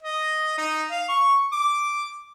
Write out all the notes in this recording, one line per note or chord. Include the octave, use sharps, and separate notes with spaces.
D#5
D#4
F5
C#6
D6